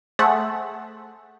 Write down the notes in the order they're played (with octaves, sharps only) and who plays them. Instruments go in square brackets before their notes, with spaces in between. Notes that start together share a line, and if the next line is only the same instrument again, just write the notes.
[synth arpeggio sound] A3 G#4 A4 C5 E5 F#5